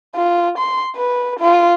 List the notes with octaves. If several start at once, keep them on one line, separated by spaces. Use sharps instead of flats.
F4
C6
B4
F4